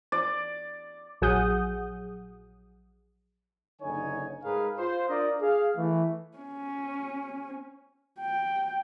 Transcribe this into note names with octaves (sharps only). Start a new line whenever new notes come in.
D5
A#1 F#3 G#4 F#5 D#6 G6
F#1 D3 D#4 C#5 G#5
G#2 G#3 G#4 A#4 B4 F5
F4 C5
D4 F4 A#4 D5 D#5
G#4 F5
E3 A3
C#4
G5